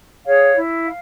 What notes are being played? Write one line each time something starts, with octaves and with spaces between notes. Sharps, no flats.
G#4 C#5 F5
E4
F5